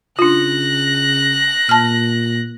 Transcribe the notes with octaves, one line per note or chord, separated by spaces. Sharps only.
C#3 D4 F4 F#6 A#6
A#2 A5 F6